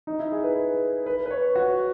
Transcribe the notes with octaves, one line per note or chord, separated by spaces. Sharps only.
D#4
E4
G#4
B4
B4
B4
C#5
F#4